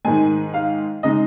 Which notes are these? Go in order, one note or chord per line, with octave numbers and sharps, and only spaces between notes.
G#2 D#3 G#3 G#5
F5
C#3 G#3 D#4 D#5